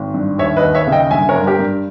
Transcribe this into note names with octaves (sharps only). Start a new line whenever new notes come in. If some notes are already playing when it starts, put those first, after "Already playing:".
Already playing: G#1
G2
D#2 C#5 E5
B4 D#5
D#2
C#5 E5
C#3
D#5 G5
G1 E5 G#5
A#4 C#5
G1
G4 A#4
G2